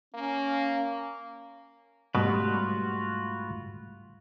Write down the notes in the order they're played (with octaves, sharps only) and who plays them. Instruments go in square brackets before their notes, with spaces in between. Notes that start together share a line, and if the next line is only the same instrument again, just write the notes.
[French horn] A#3 [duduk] C#4
[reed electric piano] G#2 A3 [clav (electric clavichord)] B2 [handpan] G3 [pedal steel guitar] F4 F#4 B4